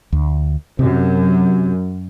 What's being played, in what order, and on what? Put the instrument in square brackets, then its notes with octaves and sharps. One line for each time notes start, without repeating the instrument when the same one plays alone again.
[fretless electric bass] D2
[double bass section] F#2 [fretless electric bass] C3